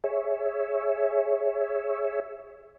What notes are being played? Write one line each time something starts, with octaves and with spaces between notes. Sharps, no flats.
G#4 C#5 E5